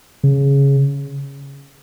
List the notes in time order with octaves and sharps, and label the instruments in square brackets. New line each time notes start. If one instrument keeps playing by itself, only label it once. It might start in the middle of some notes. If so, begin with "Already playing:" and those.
[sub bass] C#3